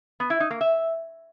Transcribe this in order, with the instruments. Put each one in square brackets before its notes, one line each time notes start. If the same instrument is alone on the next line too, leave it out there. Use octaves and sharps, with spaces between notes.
[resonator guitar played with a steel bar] B3
E4
D#4
A#3
E5